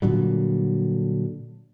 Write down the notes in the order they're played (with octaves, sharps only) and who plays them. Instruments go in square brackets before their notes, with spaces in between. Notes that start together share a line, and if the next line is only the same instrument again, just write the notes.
[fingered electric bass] A#2 D3 F#3 G3